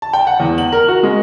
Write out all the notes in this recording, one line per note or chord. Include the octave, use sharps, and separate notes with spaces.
A5
G5
F#5
E2
F#7
A#4
F#4
G#3